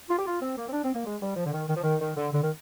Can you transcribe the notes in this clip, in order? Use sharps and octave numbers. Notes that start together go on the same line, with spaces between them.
F4
G4
F4
C4
A#3
C4
D4
C4
A#3
G#3
G3
F3
D3
D#3
D#3
F3
D#3
D#3
D3
D3
D#3